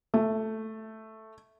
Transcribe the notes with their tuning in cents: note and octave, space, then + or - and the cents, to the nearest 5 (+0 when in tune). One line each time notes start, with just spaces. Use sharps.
A3 +0